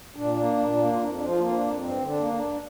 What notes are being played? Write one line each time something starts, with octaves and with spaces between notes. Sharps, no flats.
A#2 D4
A#3
A#2
A#3
F4
F2 D4
F3 D4
F4
A#3 F4
D4
F2
G2 C4
D3
D4
A#3
D4
G2